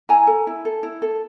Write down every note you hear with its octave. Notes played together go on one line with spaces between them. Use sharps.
E4 G#5 A#5
A4
E4
A4
E4
A4